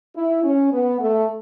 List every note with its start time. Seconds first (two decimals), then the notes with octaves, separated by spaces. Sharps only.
0.16 E4
0.44 C#4
0.72 B3
1.00 A3